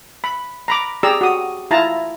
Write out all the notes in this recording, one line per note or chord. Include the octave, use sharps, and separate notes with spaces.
B5
A#5 B5 D6
G4 G#4 D5 A#5 E6
F#4 D#6
E4 F4 A5 A#5